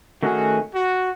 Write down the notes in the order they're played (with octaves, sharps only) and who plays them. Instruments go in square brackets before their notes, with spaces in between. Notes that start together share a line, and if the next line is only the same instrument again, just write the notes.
[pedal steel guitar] D#3 A3 C#4 G#4 [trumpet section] F#4
[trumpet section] F#4